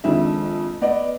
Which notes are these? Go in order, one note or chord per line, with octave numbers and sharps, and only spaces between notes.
F2 D#3 G#3 D4 E5
B3 D5 D#5